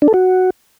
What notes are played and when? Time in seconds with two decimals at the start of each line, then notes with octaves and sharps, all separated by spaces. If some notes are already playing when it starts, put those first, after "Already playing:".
0.02 D4
0.08 A4
0.14 F#4